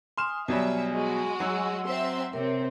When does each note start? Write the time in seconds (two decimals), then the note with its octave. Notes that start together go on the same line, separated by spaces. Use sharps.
0.18 G#5 C6 D#6 F6 E7
0.48 B2 F#3 G3 E5 G#5
0.93 G#3 F#4
1.40 F#3 F#5 E6
1.85 C4 E5 C6
2.33 C3 C4 A#4 C#5